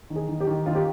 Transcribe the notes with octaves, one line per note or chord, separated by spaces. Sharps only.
D#3
G#4
D#3
G4
D#3
D#3 F4
G4